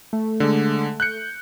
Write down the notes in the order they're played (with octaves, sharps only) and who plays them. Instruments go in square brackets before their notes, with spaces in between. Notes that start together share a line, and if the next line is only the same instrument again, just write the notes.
[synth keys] A3
[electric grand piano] D3 G#3
F#6 G6 C#7